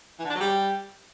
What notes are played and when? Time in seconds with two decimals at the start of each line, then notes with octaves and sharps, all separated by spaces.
0.19 E3
0.25 D3
0.30 D4
0.35 F#3
0.40 G3